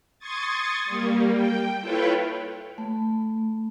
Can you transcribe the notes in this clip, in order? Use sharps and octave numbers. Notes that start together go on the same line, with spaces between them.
C6 C#6 D#6 G#6 A6
G3 A#3
G5
E4 F4 A4 B4 C#5 G5
A3